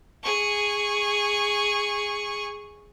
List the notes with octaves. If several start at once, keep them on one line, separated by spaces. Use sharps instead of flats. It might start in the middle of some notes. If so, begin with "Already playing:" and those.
G#4 C#6